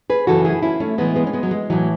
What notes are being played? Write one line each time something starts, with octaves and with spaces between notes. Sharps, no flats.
G#4 B4
F#2 C#3 E3 F#4 A4
E4 G#4
C#4 E4
A3 C#4
A2 E3 G#3 B3
G#3 B3
C#4
G#3 B3
F#3
G#3
A2 E3 F#3